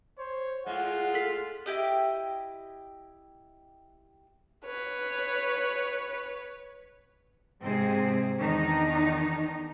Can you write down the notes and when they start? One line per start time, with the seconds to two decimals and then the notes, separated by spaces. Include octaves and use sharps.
0.19 C5 C#5
0.66 A2 G#3 F4 F#5
1.14 A4 B6 C7
1.66 E4 G4 D#5
4.66 B4 C#5
7.61 G#2 C3 C4 G#4
8.37 E2 D#3 D4 D#4